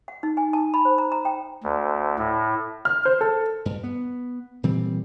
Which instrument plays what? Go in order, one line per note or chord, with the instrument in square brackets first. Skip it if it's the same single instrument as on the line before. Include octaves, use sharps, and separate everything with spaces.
[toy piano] F#5
D#4
G#5
A5
B5
C5
A#5
A#5
G5
[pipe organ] D2
A2
[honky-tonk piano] F6
C5
A4
[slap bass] G2
B3
A#2 E3 G3 C4